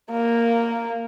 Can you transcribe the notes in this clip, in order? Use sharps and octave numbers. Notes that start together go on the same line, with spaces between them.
A#3